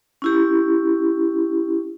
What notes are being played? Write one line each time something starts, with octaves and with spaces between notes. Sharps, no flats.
C#4 E4 G4